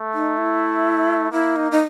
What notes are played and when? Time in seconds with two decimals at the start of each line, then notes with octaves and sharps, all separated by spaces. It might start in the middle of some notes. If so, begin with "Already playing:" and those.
Already playing: A3
0.14 D#4
0.37 E4
1.32 A#3 E4
1.56 D#4
1.72 D#4